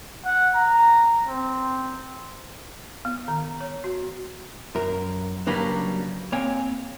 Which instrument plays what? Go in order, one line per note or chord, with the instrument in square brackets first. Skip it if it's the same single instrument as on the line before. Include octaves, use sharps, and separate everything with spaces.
[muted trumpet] F#5
A#5
C4
[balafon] B3
D#3
C#5
F#4
[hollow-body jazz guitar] F#2 A#4
C#3 F#3 G3 A#3 D4 B4
A#3 C4 C#5 G5 G#5